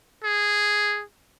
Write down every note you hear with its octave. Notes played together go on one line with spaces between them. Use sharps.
G#4